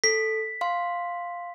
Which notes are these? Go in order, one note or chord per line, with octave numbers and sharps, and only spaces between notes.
A4 B6
F5 C6